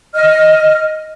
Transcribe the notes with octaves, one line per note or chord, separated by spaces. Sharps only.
D#5 F6